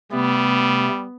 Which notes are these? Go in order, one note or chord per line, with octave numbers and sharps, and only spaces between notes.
C3 G3 A3 B3